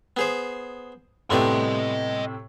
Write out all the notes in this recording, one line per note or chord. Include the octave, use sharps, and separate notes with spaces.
B3 G#4 C5
A2 C3 A3 B3 D5 D#5 G5 C6